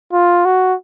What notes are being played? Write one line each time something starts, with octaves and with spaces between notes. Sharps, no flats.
F4
F#4